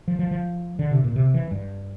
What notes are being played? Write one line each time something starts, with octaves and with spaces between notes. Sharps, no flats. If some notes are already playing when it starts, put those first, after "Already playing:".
F3
F3
F3
D3
C3
A#2
C3
E3
G2